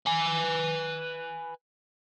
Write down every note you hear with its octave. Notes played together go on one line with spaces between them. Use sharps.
B4 G#5